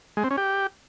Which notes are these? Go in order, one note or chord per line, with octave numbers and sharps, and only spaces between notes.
G#3
C4
C#4
G4